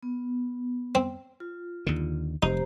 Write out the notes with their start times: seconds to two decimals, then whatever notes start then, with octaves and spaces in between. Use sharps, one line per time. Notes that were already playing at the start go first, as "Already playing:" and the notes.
0.03 B3
0.95 C4
1.40 F4
1.87 D#2 D3
2.43 F1 D#4 G4 C5 A#5